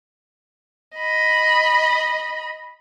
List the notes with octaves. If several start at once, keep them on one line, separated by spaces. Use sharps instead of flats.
D#5 B5